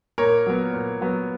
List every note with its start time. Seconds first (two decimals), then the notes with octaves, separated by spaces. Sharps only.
0.18 A#2 A#4 C#5
0.46 F#3 B3
0.73 A#2
1.01 F#3 B3